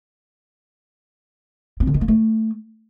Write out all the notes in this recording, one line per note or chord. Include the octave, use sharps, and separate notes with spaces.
C4
D3
D#3
A#3
A3